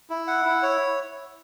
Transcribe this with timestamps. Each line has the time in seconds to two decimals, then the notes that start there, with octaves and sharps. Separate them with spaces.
0.10 E4
0.27 F#5
0.45 E4
0.63 C#5